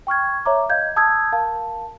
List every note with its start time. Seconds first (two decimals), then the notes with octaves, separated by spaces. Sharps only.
0.07 G5 C#6 F6 G#6
0.45 C#5 E5 A#5 D6
0.70 D#5 F5 G6 G#6
0.96 A5 D#6 E6 G6 G#6
1.32 A#4 F5 A5